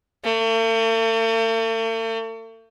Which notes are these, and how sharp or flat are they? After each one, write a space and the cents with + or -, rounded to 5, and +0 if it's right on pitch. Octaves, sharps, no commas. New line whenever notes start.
A3 +45